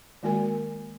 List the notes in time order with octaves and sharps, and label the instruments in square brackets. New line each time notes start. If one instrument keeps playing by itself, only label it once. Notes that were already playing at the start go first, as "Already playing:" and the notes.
[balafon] D#3 G#3 A#3 F#4 A#4 G#5